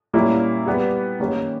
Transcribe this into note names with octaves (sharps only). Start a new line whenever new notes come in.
A#2 G3 A#3 C#4 E4
G3 B3 G4
D#3 A#3 C#4 G4